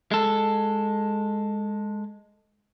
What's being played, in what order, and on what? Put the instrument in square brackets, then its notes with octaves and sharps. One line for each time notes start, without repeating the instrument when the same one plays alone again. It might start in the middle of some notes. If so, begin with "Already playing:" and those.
[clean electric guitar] G#3 A4